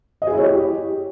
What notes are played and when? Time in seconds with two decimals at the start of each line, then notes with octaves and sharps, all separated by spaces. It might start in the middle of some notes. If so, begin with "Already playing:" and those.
0.22 D#5
0.27 G#4
0.32 E4
0.38 C#5
0.43 G4